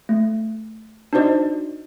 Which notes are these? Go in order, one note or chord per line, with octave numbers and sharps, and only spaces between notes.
A3
D4 D#4 F#4 C5 D5 D#5